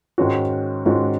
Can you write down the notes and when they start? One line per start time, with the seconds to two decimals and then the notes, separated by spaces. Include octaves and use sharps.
0.18 G#2 D#3 G#3 C#4 F#4
0.86 G#2 D#3 G#3 C#4 F#4